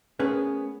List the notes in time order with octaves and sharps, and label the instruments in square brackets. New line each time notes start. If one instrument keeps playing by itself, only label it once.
[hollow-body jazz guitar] A3 B3 C#4 G#4 A#4 B4